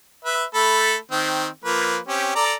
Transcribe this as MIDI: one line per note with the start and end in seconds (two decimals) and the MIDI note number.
0.25 0.44 71
0.25 0.44 76
0.54 0.96 57
0.54 0.96 69
0.54 0.96 83
1.11 1.47 51
1.11 1.47 60
1.65 1.99 53
1.65 1.99 58
1.65 1.99 71
2.08 2.30 60
2.08 2.30 61
2.08 2.30 67
2.36 2.54 69
2.36 2.54 74
2.36 2.54 82